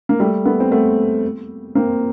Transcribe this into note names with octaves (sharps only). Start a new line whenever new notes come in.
A#3
G3 A3
A3 B3
C4
A3 B3
A#3 C4